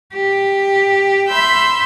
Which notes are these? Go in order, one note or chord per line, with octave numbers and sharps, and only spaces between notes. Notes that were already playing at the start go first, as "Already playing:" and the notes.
G4
E5 B5 C6 E6 G6